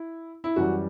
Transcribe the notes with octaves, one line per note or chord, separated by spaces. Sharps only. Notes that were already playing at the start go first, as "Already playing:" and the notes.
Already playing: E4
E4
F#2 E3 G3 F#4